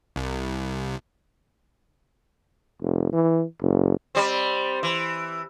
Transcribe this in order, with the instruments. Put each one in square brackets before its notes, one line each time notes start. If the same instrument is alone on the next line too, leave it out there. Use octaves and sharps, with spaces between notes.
[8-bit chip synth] C2
[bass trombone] F1
E3
F#1
[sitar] G3 C4
E3